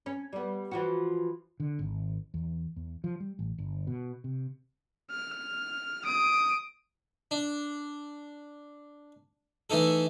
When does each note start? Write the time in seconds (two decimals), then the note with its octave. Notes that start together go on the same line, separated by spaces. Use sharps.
0.06 C#4
0.33 G3 B3
0.71 E3 F3 F#4
1.60 D3
1.79 G#1
2.34 E2
2.76 E2
3.04 F3
3.20 G3
3.39 A1
3.58 G1
3.87 B2
4.24 C3
5.11 F6
6.05 D#6 D7
7.31 D4
9.70 E3 A3 D#4 A4